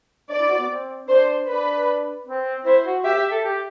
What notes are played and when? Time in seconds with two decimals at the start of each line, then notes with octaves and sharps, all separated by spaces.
0.29 D4 D5
0.39 E4
0.49 F#4
0.58 B3
0.69 C4
1.08 D4 C5
1.47 D4 B4
2.27 C4
2.65 E4 C5
2.85 F#4
3.04 G4 E5
3.17 G4
3.31 A4
3.44 G4